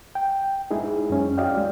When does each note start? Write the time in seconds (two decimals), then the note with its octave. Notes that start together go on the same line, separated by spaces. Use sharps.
0.15 G5
0.71 G#3 D#4 E4 G#4
1.10 F#2 C#4
1.38 F#4 D5 D#5 F5 G5
1.57 G#3